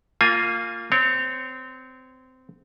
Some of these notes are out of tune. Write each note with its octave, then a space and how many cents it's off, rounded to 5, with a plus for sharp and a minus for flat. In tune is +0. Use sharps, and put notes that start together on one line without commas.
A#3 -20 F4 +0 G#5 +0
C4 -20 C#5 +0